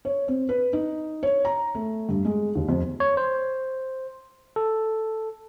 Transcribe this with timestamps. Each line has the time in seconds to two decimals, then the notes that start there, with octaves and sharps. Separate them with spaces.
0.05 C#5
0.28 C4
0.49 B4
0.73 D#4
1.23 C#5
1.45 A#5
1.75 A3
2.09 G2
2.25 G#3
2.55 D#2
2.69 F2
3.00 C#5
3.17 C5
4.56 A4